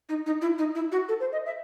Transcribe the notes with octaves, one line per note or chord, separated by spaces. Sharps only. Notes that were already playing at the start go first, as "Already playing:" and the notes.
D#4
D#4
E4
D#4
E4
F#4
A4
C5
D#5
E5